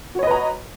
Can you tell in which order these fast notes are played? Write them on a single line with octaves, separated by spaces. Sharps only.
F#4 C#5 D#5 B4 A#5